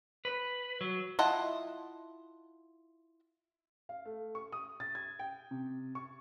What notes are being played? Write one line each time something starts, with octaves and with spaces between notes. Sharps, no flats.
B4
F#3
E4 F4 D#5 F#5 A5
F5
A3
C#6
D#6
A6
G#6
G5
C3
C#6